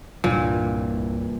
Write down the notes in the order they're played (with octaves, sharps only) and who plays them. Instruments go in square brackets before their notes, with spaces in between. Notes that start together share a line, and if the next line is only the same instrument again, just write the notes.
[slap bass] C2 G2 E3 [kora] A#2